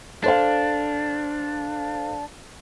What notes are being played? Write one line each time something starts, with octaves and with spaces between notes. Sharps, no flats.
D4 A4 C5 F5